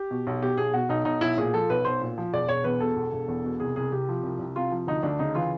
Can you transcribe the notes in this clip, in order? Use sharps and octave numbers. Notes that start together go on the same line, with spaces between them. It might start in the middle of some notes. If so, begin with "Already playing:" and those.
Already playing: G4
B2
B1
B2 G4
B1 G#4
B2 F#4
B1 D#4
B1 D#4
B1 E4
A#2 G#4
F3 A4
B1 B4
B1 C5
A#2
F3
E1 D5
E1 C#5
E2 B4
B2 A4
E1
E1
E2
B2
C2 G#4
C2 G#4
C3 G4
F3
C2
C2
C3 F4
F3
D2 D#4
D2 D4
C#3 D#4
E3 F4